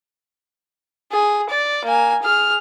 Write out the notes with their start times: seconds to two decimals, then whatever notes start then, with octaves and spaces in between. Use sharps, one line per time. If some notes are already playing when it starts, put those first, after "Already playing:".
1.12 G#4
1.49 D5
1.85 A#3 G#5
2.22 G#4 F6